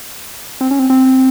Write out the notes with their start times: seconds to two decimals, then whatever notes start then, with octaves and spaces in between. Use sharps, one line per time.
0.61 C4
0.71 C#4
0.79 C4
0.90 C4